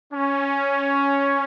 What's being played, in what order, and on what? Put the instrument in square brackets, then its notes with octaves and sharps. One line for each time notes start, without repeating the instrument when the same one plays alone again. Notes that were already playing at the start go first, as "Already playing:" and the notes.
[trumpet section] C#4